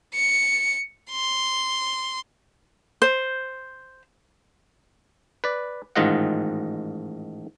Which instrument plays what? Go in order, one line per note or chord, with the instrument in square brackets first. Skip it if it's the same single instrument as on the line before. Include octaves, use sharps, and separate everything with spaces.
[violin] C#7
C6
[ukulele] C5
[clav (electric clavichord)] B4 D5
A1 G#2 D#3 F4 D#5 F#5